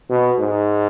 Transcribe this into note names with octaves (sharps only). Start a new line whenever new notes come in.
B2
G#2